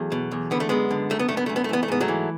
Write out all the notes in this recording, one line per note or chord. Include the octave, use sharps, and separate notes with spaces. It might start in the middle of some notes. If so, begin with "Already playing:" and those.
Already playing: E2 F#3 A3
B2
E2
D3 B3
A3
F#2 G#3 B3
D3
F#2 A3
B3
D3 A3
B3
F#2 A3
B3
A3
E3 B3
A3
G#2 B3
F#3 A3
E3